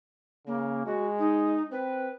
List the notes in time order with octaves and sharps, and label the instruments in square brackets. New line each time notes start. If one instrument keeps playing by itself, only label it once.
[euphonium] C#3 [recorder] A#3
[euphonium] G#3 [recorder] F#4
[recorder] D#4
[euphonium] C4 [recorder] B4